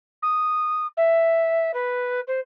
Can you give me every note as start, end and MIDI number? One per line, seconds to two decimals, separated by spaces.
0.22 0.87 87
0.97 1.71 76
1.73 2.20 71
2.27 2.40 72